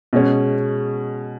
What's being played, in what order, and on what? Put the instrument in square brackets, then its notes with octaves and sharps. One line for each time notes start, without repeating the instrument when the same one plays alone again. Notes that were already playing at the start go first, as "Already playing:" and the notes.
[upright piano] B2 G#3 C#4